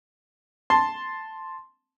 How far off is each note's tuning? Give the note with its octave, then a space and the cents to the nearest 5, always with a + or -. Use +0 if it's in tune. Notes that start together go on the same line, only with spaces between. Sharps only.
A5 +0 C6 +0